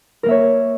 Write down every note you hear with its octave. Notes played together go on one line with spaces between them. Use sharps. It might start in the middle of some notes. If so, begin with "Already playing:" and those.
A#3 A#4 C#5 E5